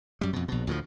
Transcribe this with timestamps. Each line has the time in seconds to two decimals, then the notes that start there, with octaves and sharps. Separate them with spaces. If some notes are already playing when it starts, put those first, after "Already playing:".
0.21 F#2 G3
0.33 F2 B2
0.48 A#1 B2
0.67 D2 A2 E3 F3